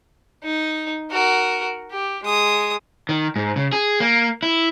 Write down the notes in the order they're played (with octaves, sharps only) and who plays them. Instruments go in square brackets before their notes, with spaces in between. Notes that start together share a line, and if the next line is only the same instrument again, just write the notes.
[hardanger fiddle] D#4
F#4 A#4
G4
G#3 D#6
[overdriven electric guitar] D#3
G#2
C#3
G#4
A#3
E4